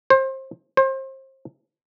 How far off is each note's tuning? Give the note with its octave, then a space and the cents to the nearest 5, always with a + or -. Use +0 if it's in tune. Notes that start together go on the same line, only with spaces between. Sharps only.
C5 +25
C5 +30